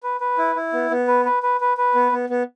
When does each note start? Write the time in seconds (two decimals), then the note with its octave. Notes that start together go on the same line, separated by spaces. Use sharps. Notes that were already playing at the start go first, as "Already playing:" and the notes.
0.03 B4
0.21 B4
0.38 E4
0.56 E4
0.73 B3
0.90 B3
1.08 B4
1.25 B4
1.43 B4
1.61 B4
1.77 B4
1.95 B3
2.12 B3
2.29 B3